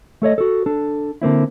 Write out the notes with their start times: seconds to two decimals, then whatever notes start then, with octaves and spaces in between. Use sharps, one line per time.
0.22 A3 A4 C#5 D#5
0.38 F#4 A4
0.66 D4 A4
1.22 D3 A#3 C4 E4